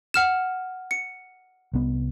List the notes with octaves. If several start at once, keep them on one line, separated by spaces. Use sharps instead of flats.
F#5 F6 E7
C#7
C2 B3